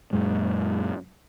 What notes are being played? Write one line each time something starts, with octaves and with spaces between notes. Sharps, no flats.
F#2 A#2 G#3